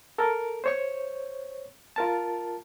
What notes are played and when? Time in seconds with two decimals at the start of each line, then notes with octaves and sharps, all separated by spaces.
0.18 A4 A#4
0.64 C5 C#5 C#6
1.96 F4 A#4 A5